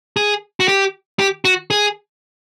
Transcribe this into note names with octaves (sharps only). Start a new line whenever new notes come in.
G#4
F#4
G4
G4
F#4
G#4